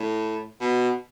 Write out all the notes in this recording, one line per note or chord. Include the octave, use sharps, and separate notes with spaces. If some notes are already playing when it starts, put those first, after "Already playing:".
Already playing: A2
B2